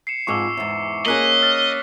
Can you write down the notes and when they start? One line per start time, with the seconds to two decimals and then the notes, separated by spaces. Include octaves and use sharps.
0.07 C7 C#7 E7
0.27 F2 G#2 G#4 C#6 D6 E6
0.57 E2 G#2
1.06 A#3 C#4 G#4 D#5 F#6 B6 F#7
1.42 F6 A6